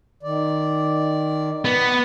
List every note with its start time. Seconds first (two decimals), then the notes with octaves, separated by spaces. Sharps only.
0.23 D#3 D5
1.65 B3